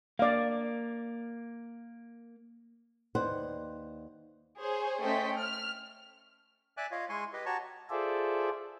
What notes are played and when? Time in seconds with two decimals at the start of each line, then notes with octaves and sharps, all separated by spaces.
0.19 A#3 D5 F5
3.15 D#2 B4 C5 D5 F#5
4.60 G#4 C5 C#5
5.02 A3 C#4 C5 D#5 G5 B6
5.37 F6
6.77 D5 E5 G#5 D6 F#6
6.91 F4 C#5 D#5 F5
7.09 G#3 E4 G#5 C6 C#6
7.33 G4 B4 D#5
7.46 F#4 G4 C#5 A5 A#5 C#6
7.90 F4 G#4 A4 C5 D5 E5